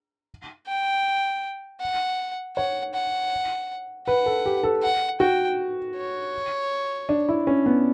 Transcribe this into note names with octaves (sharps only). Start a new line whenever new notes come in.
G5
F#5
C#5 F#5
F#5
B4 F#5
A4
G4
A4
F#5
F#4 G5
C#5
D4
E4
C#4
B3